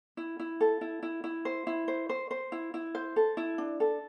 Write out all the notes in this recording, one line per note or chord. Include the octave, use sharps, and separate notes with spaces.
E4
E4
A4
E4
E4
E4
C5
E4
C5
C5
C5
E4
E4
C5
A4
E4
D4
A4